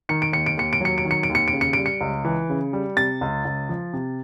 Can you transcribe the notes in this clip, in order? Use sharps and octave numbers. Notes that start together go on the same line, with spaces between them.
D#3 C#7
D7
D#2 C#7
D7
D#2 C#7
D7
F#3 C#7
D7
D#3
C#7
D7
D#2
C#7
D7
C#3
C#7
G3 D7
C#7
C#2
E3
C#3
G3
C3 A6
C#2
C#2
F3
C3